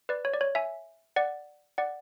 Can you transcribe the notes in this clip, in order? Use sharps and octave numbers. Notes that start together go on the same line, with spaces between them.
B4 D5
C#5
D5
C#5
E5 G#5
D5 F#5
D5 F#5